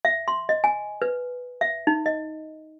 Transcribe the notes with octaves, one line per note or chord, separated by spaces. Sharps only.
E5
C6
D#5
G#5
B4
E5
D#4
D#5